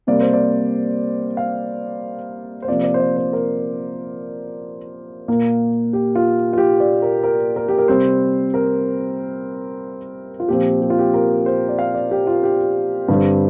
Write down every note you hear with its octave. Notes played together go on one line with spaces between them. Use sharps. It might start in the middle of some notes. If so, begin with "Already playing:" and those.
C3 G3 A#3 D5
C5
D5
F5
C5
C3 F3 A#3 D5
D5
C5
D5
C5
A#4
A#2 A#3
G4
F4
F4
G4
D5
A#4
A#4
A#4
G4
A#4
C3 G3 C4 C5
A#4
F4
A#2 F3 C4 G4
G4
F4
G4
A#4
C5
D5
F5
D5
G4
F4
G4
G2 D3 G3 C4